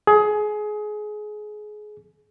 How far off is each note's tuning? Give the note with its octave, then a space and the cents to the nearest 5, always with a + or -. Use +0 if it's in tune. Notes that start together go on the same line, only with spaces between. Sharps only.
G#4 +25